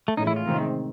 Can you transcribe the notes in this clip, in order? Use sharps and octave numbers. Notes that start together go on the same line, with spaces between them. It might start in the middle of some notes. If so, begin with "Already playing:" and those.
A3
A2 E3 G#3 C#4 D#4
E4
F4
C3 D#3 G#3 C4